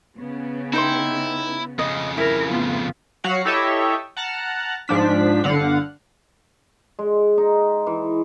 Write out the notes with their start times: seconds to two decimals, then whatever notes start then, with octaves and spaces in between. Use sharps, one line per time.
0.18 C#3 B3
0.73 D#4 E4 G5 C6
1.79 F2 C#3 D#5
2.18 E4 A#4
2.49 A3 B3 F4
3.24 F#3 F#4 F5 F#5 B6 C#7
3.45 E4 G4 A4 C#5 D#5 E5
4.17 F#5 A5 A#5 F6 F#6
4.88 G#2 F3 D4 B6
5.44 G1 D3 F5 F#5
6.99 G#3
7.38 D#4
7.87 E3